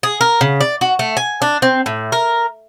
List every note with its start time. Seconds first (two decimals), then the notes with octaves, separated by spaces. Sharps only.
0.03 G#4
0.21 A#4
0.41 C#3
0.61 D5
0.81 F#4
0.99 A3
1.17 G#5
1.42 D4
1.62 C4
1.86 A2
2.12 A#4